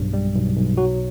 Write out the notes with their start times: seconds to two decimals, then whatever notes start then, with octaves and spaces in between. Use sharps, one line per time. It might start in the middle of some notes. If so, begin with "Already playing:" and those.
Already playing: B1 G2
0.13 G3
0.35 B1
0.56 B1
0.77 F#3 F#4